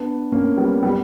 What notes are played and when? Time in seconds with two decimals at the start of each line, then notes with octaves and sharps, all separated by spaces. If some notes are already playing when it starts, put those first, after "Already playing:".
Already playing: B3 D4
0.32 A#3 C#4
0.57 G3 B3
0.83 G3 B3